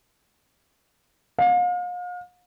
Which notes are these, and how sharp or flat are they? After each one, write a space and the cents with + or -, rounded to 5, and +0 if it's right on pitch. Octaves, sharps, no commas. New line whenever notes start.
F5 +40